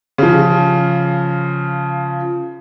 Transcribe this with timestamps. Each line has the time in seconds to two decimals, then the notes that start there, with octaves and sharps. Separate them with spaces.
0.18 C#3 F3